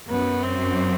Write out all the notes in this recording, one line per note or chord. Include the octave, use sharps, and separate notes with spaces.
F#2 B3
C4